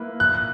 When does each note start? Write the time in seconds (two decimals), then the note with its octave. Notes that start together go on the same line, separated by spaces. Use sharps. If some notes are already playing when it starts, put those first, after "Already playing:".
Already playing: A#3 E4 B4
0.20 F#6